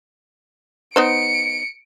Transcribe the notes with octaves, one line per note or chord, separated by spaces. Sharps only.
B3 D#4 C5 C#7 D7